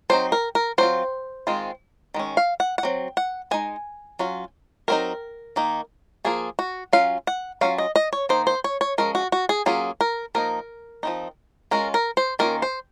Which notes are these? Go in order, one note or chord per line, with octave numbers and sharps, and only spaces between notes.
F#3 C4 D#4 C5
A#4
A#4
F#3 C4 F4 C5
D#3 G#3 C4 F4
D#3 G#3 C#4
F5
F#5
F#5
F#3 C4
F#5
G#3 D#4 G#5
F#3 C#4 F4
F#3 C4 D#4 A#4
D#3 A#3 D#4
F3 A#3 F4 G#4
F#4
F#3 C#4 F4 F5
F#5
F#3 C#4 F4 F5
D#5
D#5
C#5
D#3 A#3 D#4 C5
C5
C#5
C#5
F3 G#3 C#4 A#4
F#4
F#4
G#4
F#3 A#3 C#4 F4 G#4
A#4
F3 A#3 D#4 A#4
F3 C4 D#4
G#3 C#4 F4 A#4
A#4
C5
D#3 A#3 C#4 F4 A#4
C5